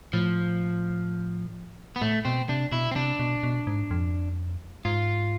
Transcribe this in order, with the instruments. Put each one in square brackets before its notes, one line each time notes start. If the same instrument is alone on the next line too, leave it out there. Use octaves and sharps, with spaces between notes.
[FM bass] A2 [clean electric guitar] F3
[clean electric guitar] B3
[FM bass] A2 [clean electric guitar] A3
[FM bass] B2 [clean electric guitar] C4
[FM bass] C3 [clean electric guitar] D4
[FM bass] B2 [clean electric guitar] E4
[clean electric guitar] C4
[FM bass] C3 [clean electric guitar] D4
[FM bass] B2
B2
G#2
F2
[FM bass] G#2 [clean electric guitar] F4